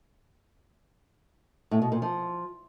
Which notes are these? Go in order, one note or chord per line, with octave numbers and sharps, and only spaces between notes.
A2
B2
A#2
F3